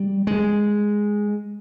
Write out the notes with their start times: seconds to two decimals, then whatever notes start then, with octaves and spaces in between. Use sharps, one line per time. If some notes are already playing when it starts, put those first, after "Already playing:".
Already playing: G3
0.27 G#3